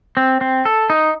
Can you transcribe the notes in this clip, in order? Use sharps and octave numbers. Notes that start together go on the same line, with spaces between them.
C4
C4
A4
D#4